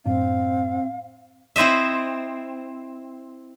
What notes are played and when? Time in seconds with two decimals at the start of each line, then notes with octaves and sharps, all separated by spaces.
0.06 F#2 A2 C4 D4 F5
1.56 C4 E4 C5 D#5 E5